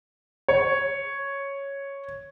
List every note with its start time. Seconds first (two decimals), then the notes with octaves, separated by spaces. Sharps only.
0.48 C#5